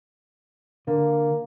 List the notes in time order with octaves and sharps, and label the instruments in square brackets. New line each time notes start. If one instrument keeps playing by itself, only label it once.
[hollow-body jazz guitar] D3 [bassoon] A#3